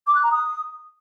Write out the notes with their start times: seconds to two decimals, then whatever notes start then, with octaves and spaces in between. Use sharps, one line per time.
0.07 D6
0.15 F#6
0.23 A#5
0.31 D#6